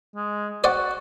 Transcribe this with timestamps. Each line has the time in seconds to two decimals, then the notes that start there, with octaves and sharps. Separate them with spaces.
0.15 G#3
0.64 F#4 C5 D5 F#5